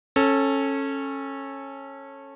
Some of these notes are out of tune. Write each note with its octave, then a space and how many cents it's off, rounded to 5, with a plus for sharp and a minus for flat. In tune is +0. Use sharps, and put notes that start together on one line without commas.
C#4 -20 A4 +0